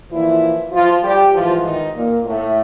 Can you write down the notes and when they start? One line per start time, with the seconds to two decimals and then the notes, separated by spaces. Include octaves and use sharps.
0.11 A#2 E3 F3 E4
0.73 F3 F4
1.03 G3 G4
1.33 G#2 E3 F3 F4
1.64 D#3 D#4
1.95 A#2 A#3
2.25 A2 A3